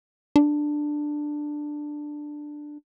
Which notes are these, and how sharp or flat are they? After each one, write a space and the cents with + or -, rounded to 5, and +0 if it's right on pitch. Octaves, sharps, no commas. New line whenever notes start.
D4 +10